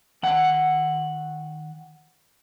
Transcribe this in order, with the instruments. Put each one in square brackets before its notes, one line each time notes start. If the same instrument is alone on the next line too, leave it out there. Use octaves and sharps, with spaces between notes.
[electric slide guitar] D#3 F#5